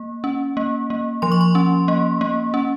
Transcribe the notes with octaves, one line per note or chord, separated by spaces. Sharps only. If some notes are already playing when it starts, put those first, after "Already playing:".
Already playing: A#3
C#4
A#3
A#3
F3 C6
C#6
C6
C#4
A#3
A#3
C#4